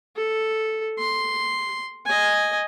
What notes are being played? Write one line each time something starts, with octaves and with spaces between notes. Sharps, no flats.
A4
C6
D#5 G#5